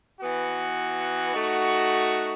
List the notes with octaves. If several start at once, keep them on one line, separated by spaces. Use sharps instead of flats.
E3 B3 F#4
A3 D#4 F#4